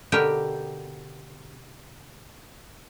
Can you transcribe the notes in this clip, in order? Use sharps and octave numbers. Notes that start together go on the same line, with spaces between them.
B2 D3 G4 A#4 G5